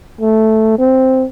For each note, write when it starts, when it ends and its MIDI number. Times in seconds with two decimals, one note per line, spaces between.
0.21 0.75 57
0.78 1.26 60